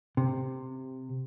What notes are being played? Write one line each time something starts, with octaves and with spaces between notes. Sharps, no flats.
C3